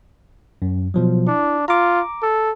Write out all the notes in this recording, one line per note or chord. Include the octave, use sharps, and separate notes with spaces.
F#2
B2 F3 F#3
D4 E4
F4 A#5 D6
A4